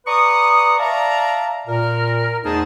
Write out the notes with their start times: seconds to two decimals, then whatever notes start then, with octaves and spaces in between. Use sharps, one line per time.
0.07 B4 D5 A#5 C#6 D#6
0.79 D5 E5 F5 A5 A#5
1.68 A#2 A#4
2.44 E2 A3 D#4 G#4 C5 A5